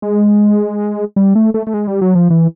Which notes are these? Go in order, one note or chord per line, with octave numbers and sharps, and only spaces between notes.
G#3
G3
A3
A3
A3
G#3
G3
F#3
F3
E3